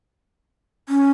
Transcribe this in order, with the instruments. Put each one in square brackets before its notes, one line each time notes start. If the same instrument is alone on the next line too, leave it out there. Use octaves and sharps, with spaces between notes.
[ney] C#4